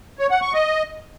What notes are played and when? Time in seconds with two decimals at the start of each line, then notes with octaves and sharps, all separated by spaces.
0.19 C#5
0.30 F#5
0.42 C#6
0.53 D#5